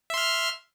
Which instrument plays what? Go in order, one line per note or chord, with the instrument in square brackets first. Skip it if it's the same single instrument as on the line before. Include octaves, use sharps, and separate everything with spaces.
[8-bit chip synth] E5
C6
F6